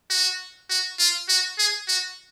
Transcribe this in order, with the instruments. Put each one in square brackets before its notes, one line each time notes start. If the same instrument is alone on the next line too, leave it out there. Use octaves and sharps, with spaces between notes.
[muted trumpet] F#4
F#4
F4
F#4
G#4
F#4